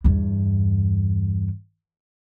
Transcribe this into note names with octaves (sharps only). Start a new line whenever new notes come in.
E2 G2